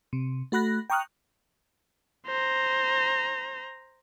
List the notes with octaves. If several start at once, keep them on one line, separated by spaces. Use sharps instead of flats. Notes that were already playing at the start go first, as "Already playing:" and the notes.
C3
A3 F#4 B5 F#6 A#6
G5 A#5 C#6 D#6 F6 F#6
C5 A#5